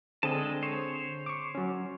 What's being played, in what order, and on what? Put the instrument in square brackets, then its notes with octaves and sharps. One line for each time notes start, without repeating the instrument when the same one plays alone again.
[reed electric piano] D3 C4 G#4 [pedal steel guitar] G#3 D#5 A5
[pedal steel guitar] C5 C#5
[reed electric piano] C#6 D6
F#3 C#4